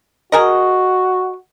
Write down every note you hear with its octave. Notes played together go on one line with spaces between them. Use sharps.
F#4 G#4 A#4 D#5